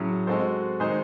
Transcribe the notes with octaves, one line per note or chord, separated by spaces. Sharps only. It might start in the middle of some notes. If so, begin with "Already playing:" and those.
Already playing: A2 F#3 C#4 G#4
G#3 C4 F#4 A4 C5
D#3 G#3 D#4 G#4 C5